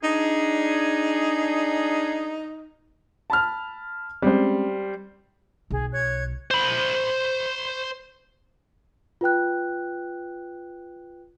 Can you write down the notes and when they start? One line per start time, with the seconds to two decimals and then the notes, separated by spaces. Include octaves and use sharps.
0.03 D4 D#4 G#4
3.30 A5 B5 F6
4.22 G3 G#3 C4 C#4 C5
5.70 B1 G#4
5.91 C#5 F#6 G#6
6.51 C5 B5
9.21 F4 B4 G5 F#6